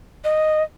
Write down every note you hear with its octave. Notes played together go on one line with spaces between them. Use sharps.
D#5